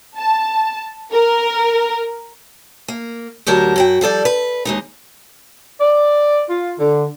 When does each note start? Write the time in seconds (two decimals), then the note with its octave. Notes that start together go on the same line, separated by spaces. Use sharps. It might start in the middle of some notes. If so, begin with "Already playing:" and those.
0.17 A5
1.12 A#4
2.88 A#3
3.47 D2 F#3 G4 A#4 A5
3.76 F#2 F#4 G5
4.01 F3 G3 A4 D5
4.25 B4
4.65 D#2 G#3 D#4
5.81 D5
6.50 F4
6.79 D3